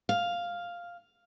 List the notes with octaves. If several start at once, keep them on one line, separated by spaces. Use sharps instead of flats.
F5